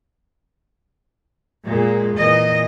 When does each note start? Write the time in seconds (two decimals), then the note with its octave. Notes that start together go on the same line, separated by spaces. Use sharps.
1.65 A#2 G#3
2.14 A#2 E3 D#5